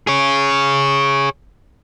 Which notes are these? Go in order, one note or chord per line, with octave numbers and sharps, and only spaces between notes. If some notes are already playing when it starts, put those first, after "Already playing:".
G#4 C#5